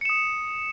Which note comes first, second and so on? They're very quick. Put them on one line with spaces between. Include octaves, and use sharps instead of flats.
C#7 E7 D#6